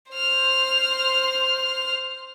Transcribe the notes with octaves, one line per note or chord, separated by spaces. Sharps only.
C5 F6